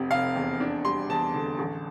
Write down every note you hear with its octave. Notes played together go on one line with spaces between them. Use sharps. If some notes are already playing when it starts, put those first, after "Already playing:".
Already playing: F1 C3
F1 F5
E2
D4
G3 C6
E2 A5
D3
A1